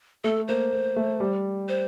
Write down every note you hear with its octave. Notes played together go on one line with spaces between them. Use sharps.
A3 A4
A#3 C5
A#3
A3
G3
C5